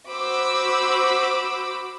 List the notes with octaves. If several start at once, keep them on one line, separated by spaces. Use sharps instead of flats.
F#4 C5 B5 D6 E6